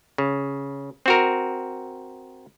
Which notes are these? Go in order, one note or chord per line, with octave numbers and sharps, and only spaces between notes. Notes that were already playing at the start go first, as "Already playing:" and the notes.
C#3
C4 F#4 A#4